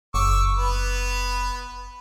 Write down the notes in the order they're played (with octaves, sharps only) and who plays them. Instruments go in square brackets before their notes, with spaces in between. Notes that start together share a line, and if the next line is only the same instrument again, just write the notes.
[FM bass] F#1 [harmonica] C#6 D6 E6
[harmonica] B3 B4